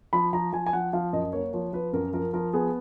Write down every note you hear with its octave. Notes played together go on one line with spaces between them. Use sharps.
F3 B5
F3 A#5
F3 G#5
G#5
F3 F#5
F3 F5
F#2 D#5
A#3 C#5
F3 C#5
F3 B4
F#2 A#4
F3 A#4
F3 A#4
B3 G#4